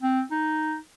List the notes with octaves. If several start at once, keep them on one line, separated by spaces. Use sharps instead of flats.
C4
D#4